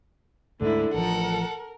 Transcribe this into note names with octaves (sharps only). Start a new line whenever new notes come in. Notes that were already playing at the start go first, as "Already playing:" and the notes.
D2 G#2 D3 A3 E4
A1 F3 A4 A#4 F#5